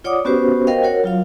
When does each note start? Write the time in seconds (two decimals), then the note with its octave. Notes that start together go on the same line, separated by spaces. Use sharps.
0.04 F4 C#5 D5 F#5 D6 D#6
0.25 B3 C#4 F#4 G4 B4 C5
0.67 A#4 C5 D#5 F5 G5
0.83 F#4 A#4 C#5 F#5
1.04 F#3 F4 F5